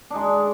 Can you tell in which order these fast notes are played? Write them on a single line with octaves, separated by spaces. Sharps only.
D4 D#4 G#3